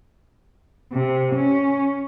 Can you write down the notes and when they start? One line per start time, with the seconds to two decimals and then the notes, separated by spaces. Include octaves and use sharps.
0.92 C3
1.36 C#4